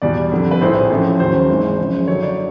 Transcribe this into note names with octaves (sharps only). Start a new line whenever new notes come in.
E2 B2 G3 D5
F2 D3 G3
B4
A#1 A2 F3 C5
A1 A2 F3
D#2 C#3 F#3 C5
G#1 G#2 E3 G#3
F#2 C#3 F3 G#3
F#1 F#2 D3 F#3 C#5
D5